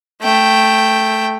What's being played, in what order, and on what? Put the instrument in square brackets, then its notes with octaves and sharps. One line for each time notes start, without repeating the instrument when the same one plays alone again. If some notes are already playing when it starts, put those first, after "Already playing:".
[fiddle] A3 G5